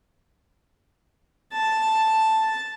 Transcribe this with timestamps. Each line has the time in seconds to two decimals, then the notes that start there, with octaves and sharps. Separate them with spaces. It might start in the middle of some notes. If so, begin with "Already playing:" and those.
1.53 A5